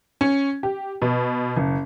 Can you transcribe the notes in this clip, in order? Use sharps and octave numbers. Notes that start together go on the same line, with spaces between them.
C#4
G4
B2
F#1